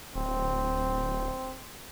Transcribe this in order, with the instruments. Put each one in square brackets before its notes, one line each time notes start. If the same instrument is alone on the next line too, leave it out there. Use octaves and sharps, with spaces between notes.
[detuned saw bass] D1 [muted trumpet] C4